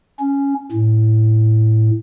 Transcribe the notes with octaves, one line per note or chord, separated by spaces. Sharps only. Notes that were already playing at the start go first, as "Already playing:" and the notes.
C#4
A2